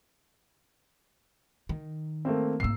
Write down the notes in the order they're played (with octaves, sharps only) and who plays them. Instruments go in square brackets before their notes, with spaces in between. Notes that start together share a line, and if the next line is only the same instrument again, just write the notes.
[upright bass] D#3
[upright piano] A3 A#3 C4
[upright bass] G#2 A#3 [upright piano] E6 C7